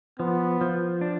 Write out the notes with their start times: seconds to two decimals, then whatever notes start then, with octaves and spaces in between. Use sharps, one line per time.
0.19 F3 B3
0.61 F3
1.01 D4